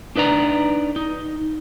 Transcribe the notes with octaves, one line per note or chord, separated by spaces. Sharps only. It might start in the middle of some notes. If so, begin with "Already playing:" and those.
D4 D#4 B4 D5 A#5
D#4